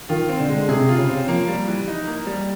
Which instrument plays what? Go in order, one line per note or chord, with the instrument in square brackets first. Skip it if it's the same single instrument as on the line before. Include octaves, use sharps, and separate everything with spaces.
[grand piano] D#3 [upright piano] F4
[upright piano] C4
[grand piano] D3
[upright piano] G#3
[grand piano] C3 [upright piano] G#4
[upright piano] F4
[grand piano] C#3
[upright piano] C4
[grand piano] F3 [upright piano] A#3
[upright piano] G3
E3
D#4
A#3
G3